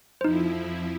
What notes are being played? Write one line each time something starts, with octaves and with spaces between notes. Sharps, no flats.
F2 F3 D#4 E4 C5